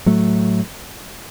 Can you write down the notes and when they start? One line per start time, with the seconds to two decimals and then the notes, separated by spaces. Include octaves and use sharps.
0.06 A2 F#3 A3